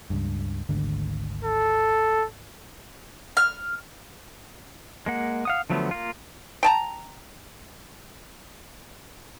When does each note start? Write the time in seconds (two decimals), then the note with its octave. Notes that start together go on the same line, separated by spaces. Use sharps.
0.10 C#2 G2
0.69 G#1 D2 D3
1.44 A4
3.37 F6
5.06 G#3 A#3 F#5
5.45 F5 F#5 D#6
5.70 D3 F3 F#3 A3 B3
5.91 A#3 F4
6.63 G5 A5 A#5